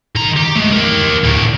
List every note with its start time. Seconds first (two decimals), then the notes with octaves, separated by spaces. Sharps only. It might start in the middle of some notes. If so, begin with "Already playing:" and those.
0.15 D#3 A#5
0.36 G4
0.55 G#3 A3
0.72 G4 A#4
1.24 D2 A2